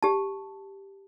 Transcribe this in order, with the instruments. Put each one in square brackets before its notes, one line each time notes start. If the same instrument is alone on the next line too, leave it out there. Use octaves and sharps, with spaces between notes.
[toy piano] G4 A5